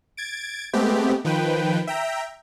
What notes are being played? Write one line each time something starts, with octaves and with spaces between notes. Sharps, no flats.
G#6 A6 D7
G#3 A3 B3 C4 G4
D#3 F3 B4 G5
E5 G5 A#5